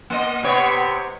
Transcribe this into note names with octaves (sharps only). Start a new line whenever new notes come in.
A#3 D#5
C3 B3 C#5